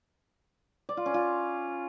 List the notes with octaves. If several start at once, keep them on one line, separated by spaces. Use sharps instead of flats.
D5
F4
C#4
F4